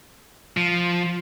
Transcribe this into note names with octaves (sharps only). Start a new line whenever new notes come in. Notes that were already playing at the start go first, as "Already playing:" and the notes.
F3